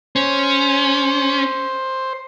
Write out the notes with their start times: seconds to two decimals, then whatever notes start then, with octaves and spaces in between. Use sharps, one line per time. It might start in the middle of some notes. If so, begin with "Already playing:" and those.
0.16 C#4 C5